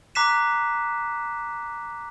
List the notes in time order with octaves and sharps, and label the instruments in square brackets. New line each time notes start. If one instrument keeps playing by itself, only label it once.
[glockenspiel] A#5 D6 F#6 B6 C7 E7